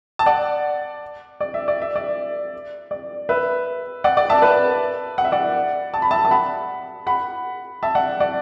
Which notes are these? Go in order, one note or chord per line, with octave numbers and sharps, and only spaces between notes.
A5
D5 F#5
D5
E5
D5
E5
D5
D5
B4 E5
D5 F#5
D5 F#5
E5 A5
B4 E5
F#5
E5
D5 F#5
A5
B5
E5 A5
A5
F#5 B5
F#5 B5
E5 A5
D5 F#5
D5 F#5